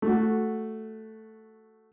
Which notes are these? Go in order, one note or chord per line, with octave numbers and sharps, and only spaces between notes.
A3 F#4